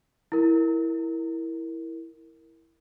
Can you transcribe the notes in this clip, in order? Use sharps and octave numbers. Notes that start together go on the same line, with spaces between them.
E4 A#4